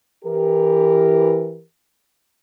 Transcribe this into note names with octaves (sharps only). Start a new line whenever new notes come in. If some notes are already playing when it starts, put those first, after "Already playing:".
E3 G4 A#4